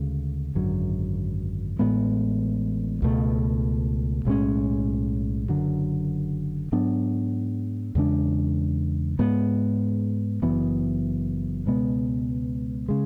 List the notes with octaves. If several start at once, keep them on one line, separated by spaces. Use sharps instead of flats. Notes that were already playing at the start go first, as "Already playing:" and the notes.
Already playing: D2 C#3 G#3
G#1 F#2 D3 F#3
A1 A2 G#3 B3
C#2 B2 A3
B1 A2 G#3 C#4
F#1 F#2 D3 F#3
G#2 F#3 B3 D4
E2 C#3 G#3 D4
G#2 G#3 B3
F#1 F#2 E3 B3
C#2 B2 G#3 B3
C#3 G#3